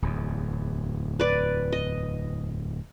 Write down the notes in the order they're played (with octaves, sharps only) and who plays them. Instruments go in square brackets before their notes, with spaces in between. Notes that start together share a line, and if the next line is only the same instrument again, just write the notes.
[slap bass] D1 E2
[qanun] B4 D5
D#5